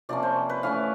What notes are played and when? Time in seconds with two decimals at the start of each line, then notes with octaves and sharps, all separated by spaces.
0.09 C3 F3 A#3 C#4 D5
0.23 C5
0.49 B4
0.63 E3 A3 C#4 F5